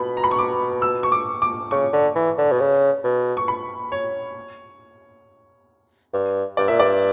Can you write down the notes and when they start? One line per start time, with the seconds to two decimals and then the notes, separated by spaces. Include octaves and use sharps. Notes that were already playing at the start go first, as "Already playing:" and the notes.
Already playing: B2 B5
0.17 A#5
0.24 B5
0.31 C#6
0.39 D6
0.82 E6
1.03 C#6
1.12 D6
1.42 D6
1.71 C#3 C#6
1.92 D3
2.15 E3
2.38 D3
2.51 B2
2.60 C#3
3.04 B2
3.37 C#6
3.48 B5
3.92 C#5
6.13 G2
6.57 G2 D5
6.68 A#2 E5
6.79 G2 D5